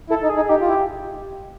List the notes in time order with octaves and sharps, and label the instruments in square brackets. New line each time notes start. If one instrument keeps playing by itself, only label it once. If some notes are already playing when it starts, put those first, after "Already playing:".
[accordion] E4 [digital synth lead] A4
[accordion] D#4
[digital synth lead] G#4
[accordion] D#4
[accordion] D#4 [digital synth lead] G4
[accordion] F4
E4